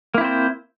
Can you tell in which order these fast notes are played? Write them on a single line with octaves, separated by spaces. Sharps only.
A#3 E4 C4 C5